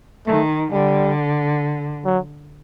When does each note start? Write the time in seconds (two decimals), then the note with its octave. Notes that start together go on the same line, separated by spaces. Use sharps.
0.27 D#3 A3
0.72 D3 G3
2.05 F#3